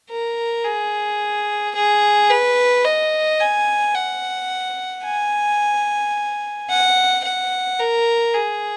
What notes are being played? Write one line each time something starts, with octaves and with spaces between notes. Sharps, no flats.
A#4
G#4
G#4
B4
D#5
G#5
F#5
G#5
F#5
F#5
A#4
G#4